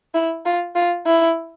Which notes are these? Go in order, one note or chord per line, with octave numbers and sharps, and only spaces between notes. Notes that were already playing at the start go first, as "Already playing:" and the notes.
E4
F4
F4
E4